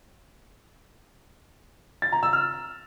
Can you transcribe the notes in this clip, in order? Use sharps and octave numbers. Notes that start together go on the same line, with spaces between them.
A6
A#5
E6
F6